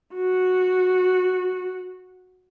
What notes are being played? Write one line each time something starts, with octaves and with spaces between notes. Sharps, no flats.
F#4